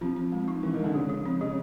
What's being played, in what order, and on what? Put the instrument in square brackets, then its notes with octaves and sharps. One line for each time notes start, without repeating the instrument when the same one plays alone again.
[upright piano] F3 [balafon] C4
[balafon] C4
G#3
D#4
[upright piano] E3 [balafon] C4
[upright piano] D#3
[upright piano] D3 [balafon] G#3
[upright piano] C#3 [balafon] F3
[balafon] F3
C4
[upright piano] C#3 [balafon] F3